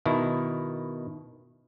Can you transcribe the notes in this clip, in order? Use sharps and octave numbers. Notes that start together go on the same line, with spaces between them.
B2 D#3 E4